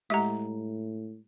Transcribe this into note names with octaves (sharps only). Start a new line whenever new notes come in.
A2 G#3 G4 E5 F#5 A#5